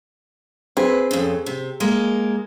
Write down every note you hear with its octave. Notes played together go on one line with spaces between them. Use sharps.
C4 G#4 B4
F2 C#3
C3
G#3 A#3 A#4